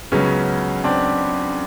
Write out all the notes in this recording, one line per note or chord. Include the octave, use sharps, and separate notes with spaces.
C#2 C#3 F#3 B3 C#4
C4 D4